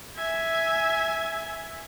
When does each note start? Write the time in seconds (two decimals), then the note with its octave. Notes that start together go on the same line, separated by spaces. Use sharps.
0.16 E5 G#5